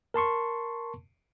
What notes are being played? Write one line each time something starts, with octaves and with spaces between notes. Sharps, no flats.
A#4 A5 C6 C#6